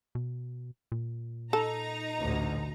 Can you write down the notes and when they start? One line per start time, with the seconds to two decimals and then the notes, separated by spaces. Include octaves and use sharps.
0.15 B2
0.92 A#2
1.53 D#4 A4 A#5
2.20 A1 D2